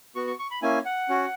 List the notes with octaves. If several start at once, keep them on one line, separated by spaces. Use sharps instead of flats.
B3 F#4 C#6
C#6
C#6
B5
A#3 C#4 E4 G#5
F#5
C#4 F#4